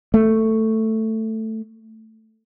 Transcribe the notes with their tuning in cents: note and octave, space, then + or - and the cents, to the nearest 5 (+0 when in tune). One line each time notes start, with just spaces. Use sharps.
A3 +10